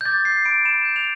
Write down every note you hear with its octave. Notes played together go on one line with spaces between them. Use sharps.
G6
D6 A6
G6 C7
B5 D7
B5 E7
G6
F7